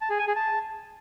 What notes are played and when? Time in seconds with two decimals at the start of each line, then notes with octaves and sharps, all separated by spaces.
0.01 A5
0.10 G#4
0.19 G#5
0.27 G#4
0.36 A5